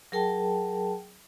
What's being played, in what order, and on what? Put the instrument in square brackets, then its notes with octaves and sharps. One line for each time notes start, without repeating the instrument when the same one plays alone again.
[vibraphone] F#3 G#4 A#4 G5 A5